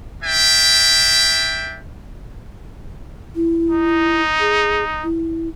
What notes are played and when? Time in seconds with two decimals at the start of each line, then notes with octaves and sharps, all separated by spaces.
0.23 D4 E5 G5
3.36 E4
3.70 D#4
4.40 G#4
5.04 E4